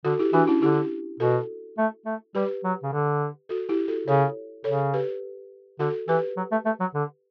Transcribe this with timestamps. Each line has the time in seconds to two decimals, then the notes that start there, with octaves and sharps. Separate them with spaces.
0.05 D3 F#4 A4
0.19 E4 G4
0.33 E3 D4 F#4
0.48 C#4 E4
0.62 D3 E4 G4
1.20 B2 F#4 A4
1.78 A3
2.06 A3
2.35 G3 G4 B4
2.64 F#3
2.83 C#3
2.92 D3
3.49 F#4 A4
3.69 E4 G4
3.88 F#4 A4
4.07 C#3 A4 C#5
4.64 C#3 A4 C#5
4.93 G4 B4
5.79 D3 F#4 A4
6.08 E3 G4 B4
6.37 F#3
6.52 A3
6.66 A3
6.80 F#3
6.94 D3